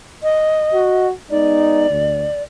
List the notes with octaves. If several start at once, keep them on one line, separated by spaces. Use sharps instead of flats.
D#5
F#4
G#3 B3 D#4 D5
D2